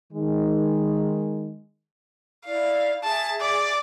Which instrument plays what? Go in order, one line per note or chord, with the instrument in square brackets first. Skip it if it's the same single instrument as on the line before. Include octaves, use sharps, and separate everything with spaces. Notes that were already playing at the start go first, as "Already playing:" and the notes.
[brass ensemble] D#3 G#3
[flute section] E4 D5 [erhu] F5
[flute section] G#4 E5 [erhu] A5
[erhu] D5